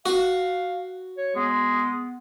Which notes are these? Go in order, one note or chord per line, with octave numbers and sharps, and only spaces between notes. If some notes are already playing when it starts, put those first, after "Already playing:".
F#4 F5
C#5
G#3 B3